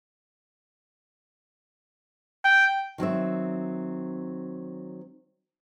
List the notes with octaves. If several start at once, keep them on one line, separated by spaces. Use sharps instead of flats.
G5
D#3 F#3 C4 E5